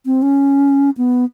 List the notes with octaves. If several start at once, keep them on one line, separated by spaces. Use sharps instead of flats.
C4
C#4
B3